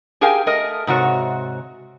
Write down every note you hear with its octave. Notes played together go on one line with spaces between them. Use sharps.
G4 G#4 A#4 F5 G5 G#5
A3 A#4 D#5
G#2 C3 F#4 C#5